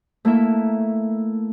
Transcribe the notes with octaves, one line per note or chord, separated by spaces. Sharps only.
A3 A#3 E4 E5